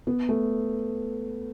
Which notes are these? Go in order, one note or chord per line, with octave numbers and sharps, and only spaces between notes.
B3
A3